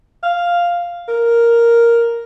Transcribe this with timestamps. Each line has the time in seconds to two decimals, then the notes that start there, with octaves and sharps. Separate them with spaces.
0.23 F5
1.08 A#4